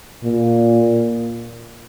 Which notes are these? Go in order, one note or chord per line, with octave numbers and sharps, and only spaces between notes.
A#2